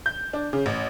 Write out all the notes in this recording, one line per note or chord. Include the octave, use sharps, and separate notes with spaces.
G6
D4
C#3
A1